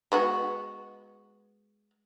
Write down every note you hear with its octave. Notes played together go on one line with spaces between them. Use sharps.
G#3 B3 F#4